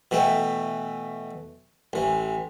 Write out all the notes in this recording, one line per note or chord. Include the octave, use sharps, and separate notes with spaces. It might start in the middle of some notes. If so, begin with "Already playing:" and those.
B2 E3 A3 G5
A1 E3